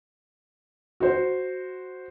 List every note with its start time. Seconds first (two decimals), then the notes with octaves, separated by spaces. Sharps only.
1.00 F#4 C5